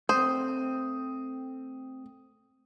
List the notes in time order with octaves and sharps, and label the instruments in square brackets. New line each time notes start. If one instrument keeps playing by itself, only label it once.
[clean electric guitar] A3 C4 [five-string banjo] C5 [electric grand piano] D#6